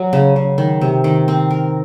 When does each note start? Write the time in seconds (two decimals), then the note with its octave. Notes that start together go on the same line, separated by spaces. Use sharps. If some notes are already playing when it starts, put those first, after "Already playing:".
Already playing: F#3
0.13 C#3
0.36 C#3
0.58 D#3
0.81 C3
1.04 D#3
1.28 C4
1.51 A#4